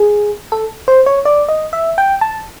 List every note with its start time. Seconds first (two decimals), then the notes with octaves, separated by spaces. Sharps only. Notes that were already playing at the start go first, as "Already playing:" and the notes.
Already playing: G#4
0.52 A4
0.88 C5
1.06 C#5
1.25 D5
1.49 D#5
1.73 E5
1.98 G5
2.21 A5